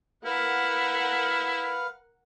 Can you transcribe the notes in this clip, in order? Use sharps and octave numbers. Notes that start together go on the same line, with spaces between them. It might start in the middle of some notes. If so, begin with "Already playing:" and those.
E4 A#4 B4 F5 F#5 F6